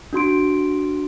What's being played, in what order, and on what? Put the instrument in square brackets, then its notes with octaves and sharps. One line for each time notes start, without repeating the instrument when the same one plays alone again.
[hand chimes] D4 F#4 C6 D7